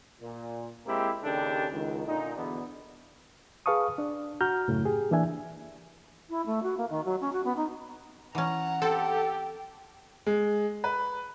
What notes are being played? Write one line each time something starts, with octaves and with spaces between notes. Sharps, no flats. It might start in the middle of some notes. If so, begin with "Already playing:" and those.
A#2
G#3 A#3 C4 E4 G4
D#2 C#3 D4 G4 A4
C#2 D#3
A#2 D3 D#4
E2 B2 D3 B3 D4
G#4 B4 F5 A5 C#6 D#6
D4 D5
F#4 A#5 F6 G6
F#2 A2 C#3 A3
G4 G#4
E3 A#3 D4 E5 G#5
E4
A3
F#4
A#3
D#3
F#3
C#4
F#4
B3
D#4
E3 C#4 F#5 A#5
C4 G4 A4
G#3
B4